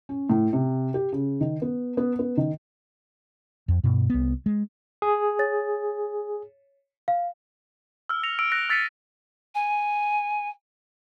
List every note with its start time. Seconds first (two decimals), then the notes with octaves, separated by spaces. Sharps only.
0.09 C#4
0.30 A2
0.53 C3
0.94 G4
1.12 C#3
1.41 D#3
1.62 B3
1.97 B3
2.19 B3
2.37 D#3
3.68 F2
3.84 G2 B2
4.10 C2 B3
4.46 G#3
5.02 G#4
5.39 C#5 A6
7.08 F5
8.09 E6 F6
8.23 A#6 C#7 F7
8.39 E6 D7
8.52 F#6 A#6 D7
8.70 E6 A6 B6 C#7 D#7 F7
9.55 G#5